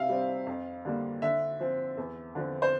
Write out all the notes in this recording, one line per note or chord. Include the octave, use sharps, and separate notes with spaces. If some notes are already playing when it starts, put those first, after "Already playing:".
Already playing: C3 E5 F5
G3 C4
F2
D3 G3 A#3
D3 E5
F3 C4
E2
D3 F3 C4
C5